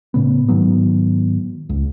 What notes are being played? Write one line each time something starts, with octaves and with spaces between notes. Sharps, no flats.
A2 C#3 B3
G#2 D#3 F#3 B3
C#2